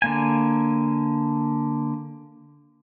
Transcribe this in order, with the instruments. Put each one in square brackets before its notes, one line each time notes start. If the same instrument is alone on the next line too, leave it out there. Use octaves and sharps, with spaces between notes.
[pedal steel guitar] D3 A#3 G#5